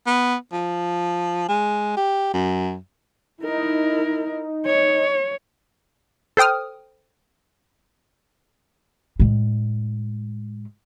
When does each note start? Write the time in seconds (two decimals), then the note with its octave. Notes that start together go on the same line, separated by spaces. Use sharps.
0.07 B3
0.52 F3
1.49 G#3
1.97 G4
2.34 F#2
3.43 D#4 E4 A#4
4.66 C#5
6.37 A4 C5 G5 D#6 F6
9.19 A2 G#3